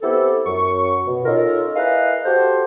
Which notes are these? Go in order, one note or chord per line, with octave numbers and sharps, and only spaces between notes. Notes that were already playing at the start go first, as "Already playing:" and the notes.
B3 C4 E4 G4 A4
F#2 C#6
B2
C#4 D#4 F4 A4 A#4
E4 G#4 A#4 B4 D#5 F5
F#4 G4 A4 C5